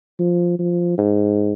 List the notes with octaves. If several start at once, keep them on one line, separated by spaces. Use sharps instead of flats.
F3
F3
G#2